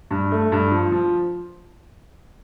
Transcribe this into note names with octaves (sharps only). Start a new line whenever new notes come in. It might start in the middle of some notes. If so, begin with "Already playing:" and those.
G2
A3
G2
F3
F3